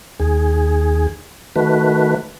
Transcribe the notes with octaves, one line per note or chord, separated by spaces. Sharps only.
D#2 G#4
D#3 A3 F#4 B4